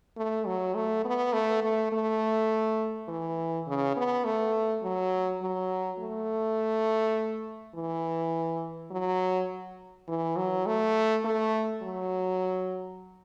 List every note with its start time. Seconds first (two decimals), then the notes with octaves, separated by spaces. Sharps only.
0.17 A3
0.47 F#3
0.75 A3
1.05 B3
1.33 A3
1.63 A3
1.92 A3
3.08 E3
3.67 C#3
3.96 B3
4.25 A3
4.83 F#3
5.42 F#3
5.99 A3
7.75 E3
8.91 F#3
10.08 E3
10.37 F#3
10.66 A3
11.25 A3
11.83 F#3